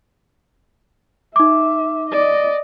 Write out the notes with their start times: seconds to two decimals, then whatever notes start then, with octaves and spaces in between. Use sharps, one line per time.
1.36 D#4 E5 D6
2.10 D5 D#5